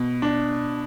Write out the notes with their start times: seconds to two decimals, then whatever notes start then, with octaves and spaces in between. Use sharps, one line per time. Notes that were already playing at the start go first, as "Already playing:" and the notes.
Already playing: B2
0.22 D4